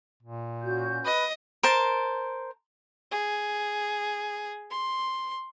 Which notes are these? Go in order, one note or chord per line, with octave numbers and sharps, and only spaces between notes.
A#2
C#4 F#4 G6
B4 D#5
A#4 C5 A5
G#4
C6